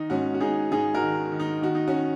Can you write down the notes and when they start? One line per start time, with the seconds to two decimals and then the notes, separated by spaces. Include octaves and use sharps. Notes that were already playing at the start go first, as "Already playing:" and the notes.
Already playing: D#3 D#4
0.10 G#2 C#4 F#4
0.34 F#4
0.40 G#2 D#4 G#4
0.71 G#2 D#4 G#4
0.94 F#4 A#4
1.02 D#3
1.32 D#3
1.40 D#4
1.62 D#3 F#4
1.75 D#4
1.87 C#4 F#4